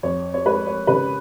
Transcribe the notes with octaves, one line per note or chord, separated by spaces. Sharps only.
F2 C#5
C#5
G#3 B4
C#5
C#3 B4